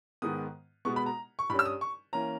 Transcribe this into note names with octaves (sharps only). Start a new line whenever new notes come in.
G#2 D#3 G#3 B3 D#6
B2 G#3 B3 C#6
B5
A#5
C#6
G2 G3 C#4 B5
E6
D#6
C#6
E3 A#3 C#4 A#5